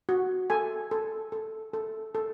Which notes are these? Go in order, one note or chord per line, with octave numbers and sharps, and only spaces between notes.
F#4
A4 G#5
A4
A4
A4
A4